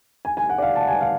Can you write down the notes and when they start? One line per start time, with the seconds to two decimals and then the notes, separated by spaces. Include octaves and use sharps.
0.25 G#5
0.37 G#5
0.50 F#5
0.58 D5
0.62 F5
0.76 A5
0.81 F#5
0.88 G#5
1.01 F5